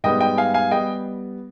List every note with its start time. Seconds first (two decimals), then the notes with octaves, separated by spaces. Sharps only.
0.04 G#2 G3 B3 D#5 G5
0.20 D#5 G5
0.38 F5 G#5
0.54 F5 G#5
0.71 G3 B3 D#5 G5